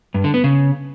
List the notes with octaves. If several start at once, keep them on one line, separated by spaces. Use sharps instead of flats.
G2
D3
B3
C#3